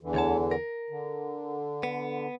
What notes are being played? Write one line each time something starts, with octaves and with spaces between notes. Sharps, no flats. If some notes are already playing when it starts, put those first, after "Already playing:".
E2 D3 E3
D2 C#5 A5
A#4
D3
B3